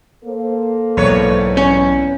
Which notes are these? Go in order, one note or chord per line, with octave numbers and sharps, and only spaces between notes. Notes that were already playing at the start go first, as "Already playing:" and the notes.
A#3 A4 C5
B1 E2 G#2 B4 C#5
C#4